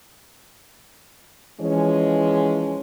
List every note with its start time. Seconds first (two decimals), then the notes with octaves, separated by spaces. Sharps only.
1.61 E3 F3 G#3 C#4